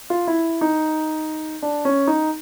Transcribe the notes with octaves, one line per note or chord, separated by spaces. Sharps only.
F4
E4
D#4
D4
C#4
D#4